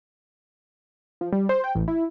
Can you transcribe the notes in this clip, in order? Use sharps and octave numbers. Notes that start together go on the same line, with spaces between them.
F3
G3
C5
G5
A1
E4